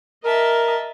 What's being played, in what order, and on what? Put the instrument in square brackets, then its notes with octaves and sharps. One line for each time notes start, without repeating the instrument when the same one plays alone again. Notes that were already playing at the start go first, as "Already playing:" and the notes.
[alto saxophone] A#4 [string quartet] D#5 E5 A5